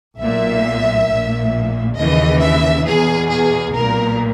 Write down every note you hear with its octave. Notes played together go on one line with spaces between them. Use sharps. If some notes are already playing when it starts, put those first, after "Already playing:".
B1 A#2 E5
A#1 A#2
D#2 C#3 E3 D#5
E5
E2 B2 G#4
G#4
B1 A#2 A#4